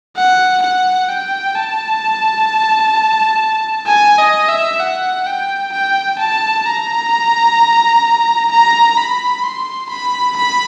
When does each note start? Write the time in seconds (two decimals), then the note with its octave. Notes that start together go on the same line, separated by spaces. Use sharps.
0.17 F#5
0.63 F#5
1.09 G5
1.55 A5
3.87 G#5
4.18 D#5
4.48 E5
4.80 F#5
5.26 G5
5.72 G5
6.18 A5
6.66 A#5
8.51 A#5
8.97 B5
9.43 C6
9.90 B5
10.36 B5